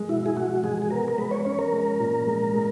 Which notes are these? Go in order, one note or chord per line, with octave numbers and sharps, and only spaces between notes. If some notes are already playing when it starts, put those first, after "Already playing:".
Already playing: G#3
B2 E4
G#4
G#3 F#4
G#3 G#4
G#4
B3 A#4
A#4
G#3 B4
C#5
C#4 C#5
A#4
G#3
A#2
G#3
G#3